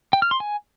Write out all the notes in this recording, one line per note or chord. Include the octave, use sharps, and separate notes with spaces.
G5
F6
C6
G#5